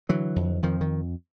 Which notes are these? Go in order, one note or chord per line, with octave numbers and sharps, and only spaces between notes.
D3 E3 F#3
F2
F2 D#3 F3
D#3